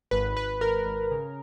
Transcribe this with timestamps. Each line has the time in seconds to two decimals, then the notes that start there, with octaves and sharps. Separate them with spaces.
0.11 G#1 B4
0.36 G#1 B4
0.61 G#1 A#4
0.86 G#1
1.11 C#3